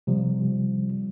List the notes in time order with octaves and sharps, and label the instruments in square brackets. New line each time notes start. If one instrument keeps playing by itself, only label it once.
[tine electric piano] C3 F3 G3